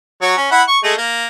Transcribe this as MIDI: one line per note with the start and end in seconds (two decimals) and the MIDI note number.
0.22 0.36 54
0.22 0.36 73
0.37 0.47 61
0.51 0.63 64
0.51 0.63 78
0.51 0.63 83
0.68 0.78 85
0.84 0.93 56
0.84 0.93 57
0.84 0.93 68
0.98 1.27 58